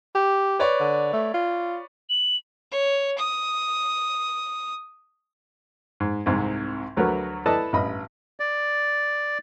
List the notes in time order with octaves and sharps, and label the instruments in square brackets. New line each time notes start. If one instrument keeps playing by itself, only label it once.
[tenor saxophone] G4
[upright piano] B4 C#5 D5
[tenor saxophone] D3
A3
F4
[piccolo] F#7
[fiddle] C#5
D#6
[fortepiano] G#2
C2 G#2 C3
D2 F#3 A3 F#4 A#4 B4
E4 A4 B4 D5 D#5 A5
A1 G2 D#5 B5
[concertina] D5